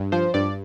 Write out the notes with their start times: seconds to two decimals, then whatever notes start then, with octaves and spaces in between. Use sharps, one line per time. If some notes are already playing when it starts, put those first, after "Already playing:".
Already playing: G2
0.12 F3 C5
0.34 G2 D5